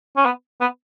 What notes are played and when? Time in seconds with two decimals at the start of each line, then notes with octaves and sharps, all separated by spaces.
0.17 C#4
0.26 B3
0.61 B3